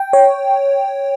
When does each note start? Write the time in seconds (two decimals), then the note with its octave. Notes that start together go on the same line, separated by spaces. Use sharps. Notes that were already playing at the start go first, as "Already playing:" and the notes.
Already playing: G5
0.13 C#5